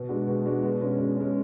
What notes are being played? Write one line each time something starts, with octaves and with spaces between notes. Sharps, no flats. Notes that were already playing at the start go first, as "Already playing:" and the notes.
Already playing: B2
G#3 D4 F#4
B2
G#3 D4 F#4
B2
G#3 C#4
B2
G#3 C#4